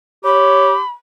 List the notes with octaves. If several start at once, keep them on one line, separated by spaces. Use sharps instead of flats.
G4 C#5 B5